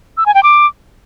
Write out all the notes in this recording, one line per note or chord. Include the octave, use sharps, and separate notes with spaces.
E6
G#5
G5
D6